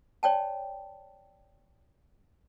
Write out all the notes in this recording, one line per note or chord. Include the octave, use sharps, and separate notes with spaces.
C#5 D5 G5 A5